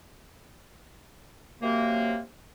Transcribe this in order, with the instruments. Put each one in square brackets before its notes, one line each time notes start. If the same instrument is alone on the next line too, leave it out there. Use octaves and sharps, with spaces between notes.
[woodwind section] F#2 C3 A#3